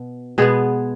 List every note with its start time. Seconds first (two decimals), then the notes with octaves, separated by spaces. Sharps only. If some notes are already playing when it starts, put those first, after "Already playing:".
Already playing: B2
0.38 B2 G#3 B3 G#4